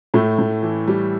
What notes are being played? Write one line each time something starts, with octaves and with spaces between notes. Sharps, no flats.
A2 A3
A2
E3
E3 G3